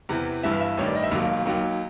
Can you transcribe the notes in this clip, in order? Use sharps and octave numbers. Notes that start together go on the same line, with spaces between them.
E2 C3 E3
G1 G2 E3 E5
F5
E5
A1 G2 D#3 C#5
D5
D#5
E5
E1 D#2 D#3 F#3 F5
D#2 D#3 F#3